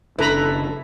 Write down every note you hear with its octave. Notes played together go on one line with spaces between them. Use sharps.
F#1 C#3 D4 E4 A4 B4 A#5 B5